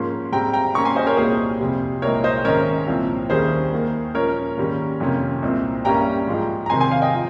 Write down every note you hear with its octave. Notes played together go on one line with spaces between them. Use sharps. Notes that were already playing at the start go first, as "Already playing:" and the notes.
Already playing: G#2 F3 A#3 C#4 C6
G#2 G3 C4 G5 A#5
G5 A#5
G#2 G3 A#3 C#4 A#5 C#6
G#5 C6
C5 D#5
A#4 C#5
C2 A#2 G3 A#3 G#4 C5
F2 C3 G3
C2 A#2 G#3 A#4 C#5
C5 D#5
G#2 D#3 G#3 C#4 A#4 C#5
C2 A#2 F3 C4
D#2 D#3 G3 C#4 G#4 C5
D#2 D#3 A#3
A#2 F3 G#3 C#4 A#4 C#5
G#2 D#3 G3 A#3 C#4
F2 C3 D#3 A#3 C#4
C2 A#2 G#3 C4
G2 G3 A#3 C#4 G5 A#5
G#2 F3 G#3
A#5
C3 D#3 G#3 C4 G#5 C6
G#5 C6
F5 G#5
D#5 G5
F3